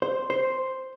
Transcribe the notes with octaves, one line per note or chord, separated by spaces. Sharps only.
C5
C5